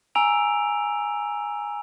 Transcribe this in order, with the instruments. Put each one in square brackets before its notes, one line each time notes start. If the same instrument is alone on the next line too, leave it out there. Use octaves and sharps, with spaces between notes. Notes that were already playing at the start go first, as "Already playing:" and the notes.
[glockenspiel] G#5 A#5 E6 D7 F7